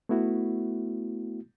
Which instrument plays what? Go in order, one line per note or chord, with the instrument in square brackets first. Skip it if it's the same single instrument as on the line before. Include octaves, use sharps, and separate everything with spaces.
[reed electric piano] A3 B3 E4 F#4